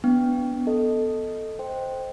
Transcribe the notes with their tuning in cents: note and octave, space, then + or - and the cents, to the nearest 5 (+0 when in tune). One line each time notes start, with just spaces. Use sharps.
B3 +5 D4 -25 G5 +0
A4 +0 D#5 +0
C5 +0 D#5 +0 G5 +0